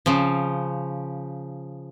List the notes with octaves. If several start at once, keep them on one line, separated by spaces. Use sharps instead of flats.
C#3 F3